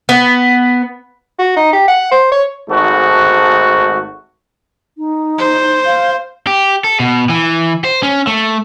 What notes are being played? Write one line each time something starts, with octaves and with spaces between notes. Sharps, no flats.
B3
F#4
D#4
G4
F#5
C5
C#5
G#1 G#2 A3 F#4
D#4
C5
F5
G4
A4
B2
E3
C5
C#4
A3